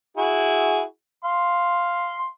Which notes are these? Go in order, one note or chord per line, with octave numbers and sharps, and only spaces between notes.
E4 F#4 G#4
F5 C6